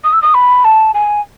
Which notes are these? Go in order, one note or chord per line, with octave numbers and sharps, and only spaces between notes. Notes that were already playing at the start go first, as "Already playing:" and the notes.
D#6
E6
D#6
B5
A5
G#5